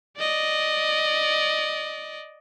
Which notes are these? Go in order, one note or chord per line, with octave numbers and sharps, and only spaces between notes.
D5 D#5